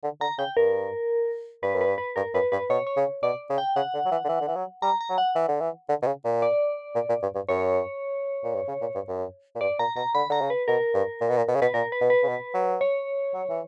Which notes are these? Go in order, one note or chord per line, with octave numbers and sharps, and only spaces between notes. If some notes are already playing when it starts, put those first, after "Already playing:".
D3
D3 A#5
C#3 G5
G2 A#4
G2 B4
F#2
G2 B4
B4
G2 A#4
F#2 B4
G2 B4
B2 C#5
C#5
C#3
B2 D5
C#3
G5
C#3 F#5
D3
F#3
E3
D3
E3
D3
E3
F#3
G3 A#5
A#5
F#3
F#5
E3
D3
E3
D3
B2
C#3
A#2
D5
A#2
A#2
G2
G2
F#2 C#5
A#2
G2
C#3
A#2
G2
F#2
A#2
G2 D5
A#2 A#5
B2 A#5
D3 B5
D3 A#5
C#3
B4
B2 A#4
G2
A#2
B2
A#2
B2
C#3
B2 B4
A#2 A#4
B4
B2
B4
C#3
B2
F#3
C#5
F#3
E3